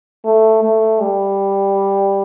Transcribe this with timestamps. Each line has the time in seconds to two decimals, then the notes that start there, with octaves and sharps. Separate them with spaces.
0.24 A3
0.63 A3
1.01 G3